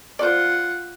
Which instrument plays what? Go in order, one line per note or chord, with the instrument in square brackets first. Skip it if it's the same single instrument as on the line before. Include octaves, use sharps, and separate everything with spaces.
[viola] F4 F#5 [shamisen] C5 D5